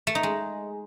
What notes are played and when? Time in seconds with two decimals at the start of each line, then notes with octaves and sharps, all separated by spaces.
0.07 A3
0.15 D#4
0.23 G#3